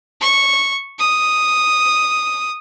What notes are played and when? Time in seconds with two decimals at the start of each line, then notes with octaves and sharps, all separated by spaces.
0.21 C#6
0.99 D#6